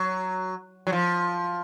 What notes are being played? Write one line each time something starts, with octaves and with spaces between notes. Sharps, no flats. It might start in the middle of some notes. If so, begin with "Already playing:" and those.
Already playing: F#3
F#3
F3